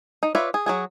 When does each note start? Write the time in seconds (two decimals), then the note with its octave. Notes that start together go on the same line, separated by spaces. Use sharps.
0.23 D#4
0.35 F4 B4 C#5 D5 E5
0.54 G#4
0.66 F#3 F#4 G#4